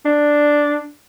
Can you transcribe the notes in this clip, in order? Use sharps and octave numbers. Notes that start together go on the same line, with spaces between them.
D4